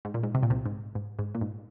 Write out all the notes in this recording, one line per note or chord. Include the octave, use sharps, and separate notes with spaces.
G#2
A#2
G#2
C3
A#2
C2 C3
G#2
G#2
G#2
A#2
G#2